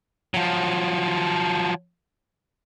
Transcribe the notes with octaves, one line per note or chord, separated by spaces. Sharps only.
F3 F#3